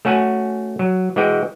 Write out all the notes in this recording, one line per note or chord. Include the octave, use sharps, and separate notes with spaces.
A3 C#4 F#4 F#5 G#5
F#3
E3 G#3 F#4 G5